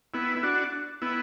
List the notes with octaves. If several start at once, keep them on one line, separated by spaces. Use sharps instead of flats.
B3 E4
E4
D4 F#4
B3 E4